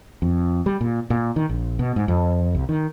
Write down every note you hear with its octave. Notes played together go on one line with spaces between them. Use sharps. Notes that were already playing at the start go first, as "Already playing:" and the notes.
F2
G3
A#2
A#2
D#3
A#1
B2
G#2
F2
C2
D#3